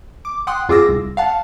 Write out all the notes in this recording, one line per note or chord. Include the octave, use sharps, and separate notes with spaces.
D6
F#5 G5 C6 D#6 F#6
F2 F4 G#4 D6 E6 A#6
C2
F5 F#5 A5